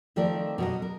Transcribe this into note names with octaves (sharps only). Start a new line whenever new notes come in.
D#3 F3 A3 C4 A#4 D5
B2 F#3 D#5
A#4